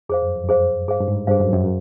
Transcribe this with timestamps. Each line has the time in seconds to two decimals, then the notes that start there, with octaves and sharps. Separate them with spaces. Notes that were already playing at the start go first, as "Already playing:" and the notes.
0.09 F2 G#4 C5 F5
0.22 F#2
0.36 F2
0.43 F#2
0.49 F2 G#4 C5 F5
0.88 G2 G#4 C5 F5
1.00 G2
1.08 G#2
1.27 G2 G#4 C5 F5
1.40 F#2
1.48 F2
1.53 F#2